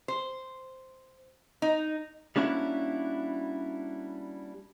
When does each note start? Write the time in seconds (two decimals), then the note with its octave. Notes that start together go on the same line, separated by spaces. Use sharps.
0.08 C5
1.62 D#4
2.36 G3 A#3 C#4 D4 E4 F#4